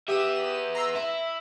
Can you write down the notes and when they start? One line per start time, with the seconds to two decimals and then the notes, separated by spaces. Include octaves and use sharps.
0.08 B3 G4 E5 D#6 E7
0.75 A#5 C6 E6
0.96 E4 E5